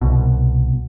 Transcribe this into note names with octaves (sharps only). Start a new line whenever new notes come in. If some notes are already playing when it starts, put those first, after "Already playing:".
C2 B2